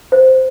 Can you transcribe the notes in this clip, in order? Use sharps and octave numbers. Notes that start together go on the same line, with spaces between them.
C5